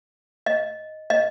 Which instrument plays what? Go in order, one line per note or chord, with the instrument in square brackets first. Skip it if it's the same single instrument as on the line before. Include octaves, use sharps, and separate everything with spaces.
[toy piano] D#5
D#5